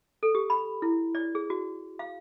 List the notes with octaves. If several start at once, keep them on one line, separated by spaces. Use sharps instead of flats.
A4
G4
B5
E4
D5
G#4
F#4
F5